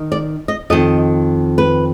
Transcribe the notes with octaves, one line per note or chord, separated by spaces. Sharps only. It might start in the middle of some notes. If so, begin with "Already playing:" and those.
Already playing: D#3
D5
D#5
F2 D#3 D#5
B4